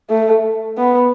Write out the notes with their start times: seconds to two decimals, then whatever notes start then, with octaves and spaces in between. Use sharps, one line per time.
0.10 A3
0.78 B3